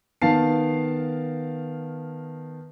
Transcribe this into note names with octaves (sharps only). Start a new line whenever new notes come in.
D#3 B3 F5 A5 C7